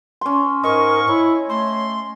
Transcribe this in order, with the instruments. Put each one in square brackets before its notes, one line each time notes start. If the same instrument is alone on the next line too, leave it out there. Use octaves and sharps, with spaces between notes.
[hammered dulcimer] C#4 C6
[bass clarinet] G#2 [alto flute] A#4 [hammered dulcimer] D#5 [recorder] C#6
[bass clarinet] E4 [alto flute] C#5
[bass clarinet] A3 [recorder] C6